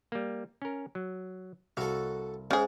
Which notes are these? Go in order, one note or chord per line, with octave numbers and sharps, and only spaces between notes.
G3 A#3
C#4 A#4
F#3
C2 F#4 A4 E5 F5
G#2 C#3 G#3 G#4